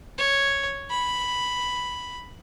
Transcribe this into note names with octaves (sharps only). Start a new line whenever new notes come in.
C#5
B5